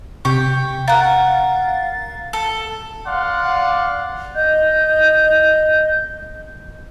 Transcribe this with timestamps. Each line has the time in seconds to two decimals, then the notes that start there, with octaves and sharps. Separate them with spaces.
0.25 C3 G4 G5 C#6
0.88 A#4 F5 F#5 A6
2.33 A4
3.07 D5 F5 F#5 C6
4.35 D#5 G6